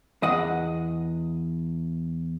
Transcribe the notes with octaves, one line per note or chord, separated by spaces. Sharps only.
E2 D#5 F#5